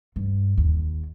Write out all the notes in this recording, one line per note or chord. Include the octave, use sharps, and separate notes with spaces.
G2
D#2